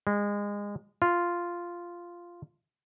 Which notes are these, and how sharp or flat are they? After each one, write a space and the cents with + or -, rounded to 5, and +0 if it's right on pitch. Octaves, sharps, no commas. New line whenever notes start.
G#3 -25
F4 -5